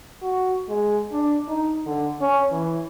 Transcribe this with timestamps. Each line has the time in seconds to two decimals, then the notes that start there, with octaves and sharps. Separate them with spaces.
0.22 F#4
0.69 G#3
1.13 D4
1.49 D#4
1.86 D3
2.21 C#4
2.52 E3